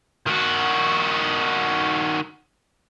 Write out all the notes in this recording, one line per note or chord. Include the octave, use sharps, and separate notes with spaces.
D#3 F#4